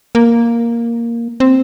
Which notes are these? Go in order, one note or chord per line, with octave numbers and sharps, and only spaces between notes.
A#3
C4